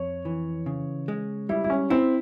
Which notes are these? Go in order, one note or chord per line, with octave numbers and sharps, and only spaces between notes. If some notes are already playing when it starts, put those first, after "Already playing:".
Already playing: F2 C#5
E3
C#3
G#3
G3 E4
E4
C#4
C4 E4